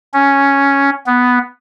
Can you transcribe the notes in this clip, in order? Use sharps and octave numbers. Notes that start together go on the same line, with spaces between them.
C#4
B3